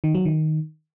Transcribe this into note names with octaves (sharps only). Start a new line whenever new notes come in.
D#3
F#3
D#3